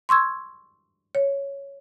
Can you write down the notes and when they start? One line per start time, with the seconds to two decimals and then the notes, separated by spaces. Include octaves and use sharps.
0.09 C6 C#6 E6 G#6
1.15 C#5